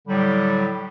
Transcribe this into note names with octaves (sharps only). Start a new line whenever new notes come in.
A2 D3 F#3 G3